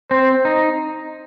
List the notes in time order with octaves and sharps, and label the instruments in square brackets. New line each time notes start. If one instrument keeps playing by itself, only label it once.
[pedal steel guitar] C4 [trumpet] C5
[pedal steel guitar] D#4